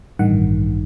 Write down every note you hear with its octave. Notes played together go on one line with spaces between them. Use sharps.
A1 G2 D#3 F#5